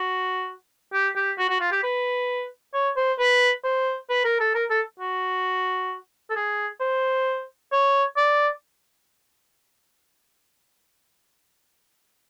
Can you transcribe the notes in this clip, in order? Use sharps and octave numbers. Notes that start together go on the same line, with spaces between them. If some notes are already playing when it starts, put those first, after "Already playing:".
Already playing: F#4
G4
G4
F#4
F#4
F4
G4
B4
C#5
C5
B4
C5
B4
A#4
A4
A#4
A4
F#4
A4
G#4
C5
C#5
D5